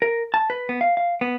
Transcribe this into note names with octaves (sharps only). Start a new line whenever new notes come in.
A#4
A5
B4
B3
F5
F5
B3